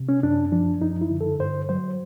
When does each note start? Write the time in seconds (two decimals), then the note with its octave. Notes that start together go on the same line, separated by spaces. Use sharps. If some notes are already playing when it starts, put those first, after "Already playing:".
Already playing: C3
0.09 C#4
0.23 F#2 D4
0.52 F3 D4
0.81 F#2 D#4
1.01 E4
1.11 D3
1.21 A4
1.40 G2 C5
1.69 F#3 C5